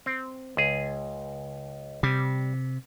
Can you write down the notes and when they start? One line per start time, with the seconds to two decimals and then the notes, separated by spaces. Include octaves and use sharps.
0.06 C4
0.57 C#2 G#4
2.03 C3 G3